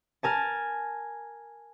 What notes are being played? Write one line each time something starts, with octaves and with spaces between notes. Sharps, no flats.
A#4 G#5 A5